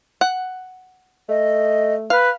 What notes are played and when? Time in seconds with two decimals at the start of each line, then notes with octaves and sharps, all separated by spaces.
0.21 F#5
1.29 A3 D#5
2.10 B4 F5